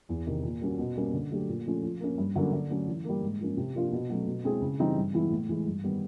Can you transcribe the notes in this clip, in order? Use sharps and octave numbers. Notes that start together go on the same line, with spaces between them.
E2
C3 D#3
A#2
G3 A#3 C#4 F#4
B2
G3 A#3 C#4
D3
F#3 A3 D4 G4
A#2
F3 A3 C#4
F3
A#3 C#4
G2
D3 F#3 A#3 C#4
D3
F#3 A3 C#4
E3
G3 A#3
G#2
F3 A#3 C#4
C3
F3 A#3 D4 F4
B2
F#3 A3 C#4
B2
G#3 C4 E4 G#4
C#3
E3 G3 C4 D#4
G2
E3 G#3 B3 E4
A2
E3 G#3
G2
D#3 G3 B3